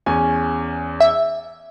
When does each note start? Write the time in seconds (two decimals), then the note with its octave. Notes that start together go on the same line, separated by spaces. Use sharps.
0.06 E2 C#4 G#5
1.00 E5